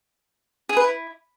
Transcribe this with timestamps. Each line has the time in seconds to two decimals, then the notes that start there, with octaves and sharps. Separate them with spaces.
0.69 G#4
0.77 B4
0.84 E4